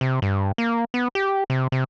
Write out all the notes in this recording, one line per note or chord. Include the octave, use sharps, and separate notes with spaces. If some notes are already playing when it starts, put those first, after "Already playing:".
C3
G2
A#3
B3
G4
C3
C3